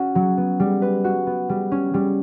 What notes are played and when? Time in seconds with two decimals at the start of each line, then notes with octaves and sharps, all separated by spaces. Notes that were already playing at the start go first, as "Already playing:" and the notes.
Already playing: C#4 F#4
0.15 F#3
0.37 B3
0.60 G3
0.82 B4
1.04 F#4
1.27 B3
1.49 G3
1.72 C#4
1.94 G3